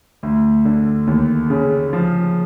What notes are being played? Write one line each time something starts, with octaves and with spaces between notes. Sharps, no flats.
D2
D3
D#2
C#3
F3